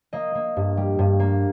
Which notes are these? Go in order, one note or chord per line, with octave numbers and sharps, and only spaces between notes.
A#3 D#5
A#3
G2
G3
G2
A#3